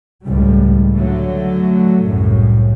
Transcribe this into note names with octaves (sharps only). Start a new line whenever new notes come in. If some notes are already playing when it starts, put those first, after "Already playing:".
C#2 A2 G3
D3 F#3 A3
C2 F#2 A2 C#3